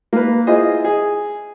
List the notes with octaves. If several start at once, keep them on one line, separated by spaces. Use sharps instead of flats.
A#3 B4
E4 F4 G#4 C5 D#5
G#4